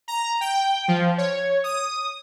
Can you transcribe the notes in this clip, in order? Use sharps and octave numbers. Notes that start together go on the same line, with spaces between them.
A#5
G5
F3
C#5
D#6